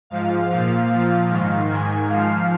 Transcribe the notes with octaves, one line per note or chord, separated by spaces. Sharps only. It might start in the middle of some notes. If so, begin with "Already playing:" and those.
G#2 F3 F5
A#2 F3 F5
A#2 F3
G#2 D#3
G#2 D#3 G#5
G#2 F3 F5